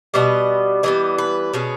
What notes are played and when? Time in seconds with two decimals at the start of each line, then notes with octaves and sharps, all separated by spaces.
0.14 B2 G3 B3 D#5
0.83 E3 G3 B3 D#5
1.18 B4
1.53 B2 G#3 C#4